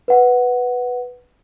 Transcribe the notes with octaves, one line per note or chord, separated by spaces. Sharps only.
B4 F#5